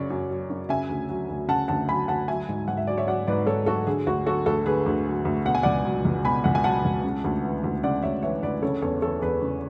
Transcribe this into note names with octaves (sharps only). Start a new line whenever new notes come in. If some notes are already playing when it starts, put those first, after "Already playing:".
Already playing: F#2 C#3 F#3 C#5 D5
F#2
F#3
F#2
C#3 E5 G#5
D2
F#3
D2
C#3 F#5 A5
D2 F#5 A5
F#3 G#5 B5
D2 F#5 A5
F#3 E5 G#5
G#2
G#2 F#5
E5
F#3 D5
C#5 E5
F#3 D5 F#5
G#2 B4 D5
G#2 A4 C#5
F#3 F#4 A4
D3 G#4
D2 F#4
F#3 F#4 A4
D2 F#4 A4
D3 G#4 B4
D2
F#3
D2
B2 F#5
G#5
C#2 D5 F#5
F#3
C#2
B2 G#5 B5
C#2 F#5
G#5
F#3 F#5 A5
C#2
C#3
D2
E3
D2
C#3 D5 F#5
D2 C#5 E5
E3 C#5 E5
D2 B4 D5
C#3 A4 C#5
E2 A4 C#5
E3 A4 C#5
E2 G#4 B4
C#3